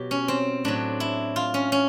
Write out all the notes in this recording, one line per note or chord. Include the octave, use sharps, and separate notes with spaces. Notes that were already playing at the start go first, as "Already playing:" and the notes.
Already playing: B2 F#3 G4
C#4
C4
A2 F#3 D4
E4
F4
C#4
C#4